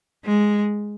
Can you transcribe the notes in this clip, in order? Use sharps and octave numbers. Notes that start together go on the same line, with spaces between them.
G#3